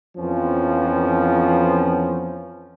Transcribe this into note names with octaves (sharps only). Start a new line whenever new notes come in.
F2 E3 F3 B3 C#4